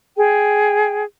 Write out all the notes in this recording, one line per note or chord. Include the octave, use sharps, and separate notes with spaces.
G#4 G5